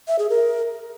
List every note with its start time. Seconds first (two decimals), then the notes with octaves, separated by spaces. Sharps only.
0.08 E5
0.19 G#4
0.30 A#4